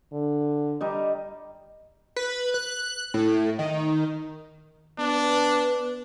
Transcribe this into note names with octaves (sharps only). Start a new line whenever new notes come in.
D3
G3 D#4
B4
F#6
A2
D#3
B3 D4 B4